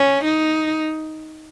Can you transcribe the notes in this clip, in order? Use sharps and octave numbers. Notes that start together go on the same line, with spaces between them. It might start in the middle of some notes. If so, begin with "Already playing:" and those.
Already playing: C#4
D#4